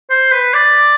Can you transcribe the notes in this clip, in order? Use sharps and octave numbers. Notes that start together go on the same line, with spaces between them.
C5
B4
D5